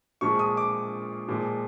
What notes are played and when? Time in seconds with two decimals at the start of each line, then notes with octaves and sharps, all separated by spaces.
0.21 A#2 F3 G#3 C#6
0.39 D#6
0.57 D6
1.28 A#2 F3 G#3